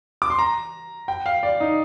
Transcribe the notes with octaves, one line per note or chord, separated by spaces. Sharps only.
D6
C6
A#5
G5
F5
D5
D#4